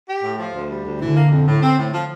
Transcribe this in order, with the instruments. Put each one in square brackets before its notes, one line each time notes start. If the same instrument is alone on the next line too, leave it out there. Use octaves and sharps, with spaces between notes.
[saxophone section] G4
A2
F3
D2
G3
D2
[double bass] D3 [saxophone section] E3
[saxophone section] A#3
F2
A2
C4
A2
F3